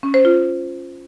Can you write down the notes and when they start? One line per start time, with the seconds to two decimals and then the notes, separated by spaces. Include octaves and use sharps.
0.03 C#4
0.14 C5
0.25 F4